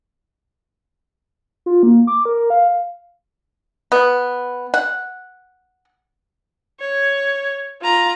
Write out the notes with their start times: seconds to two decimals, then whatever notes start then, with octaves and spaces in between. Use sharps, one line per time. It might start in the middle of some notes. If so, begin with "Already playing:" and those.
1.66 F4
1.83 A#3
2.07 D6
2.25 A#4
2.50 F5
3.92 B3
4.74 F#5
6.80 C#5
7.82 F4 A#5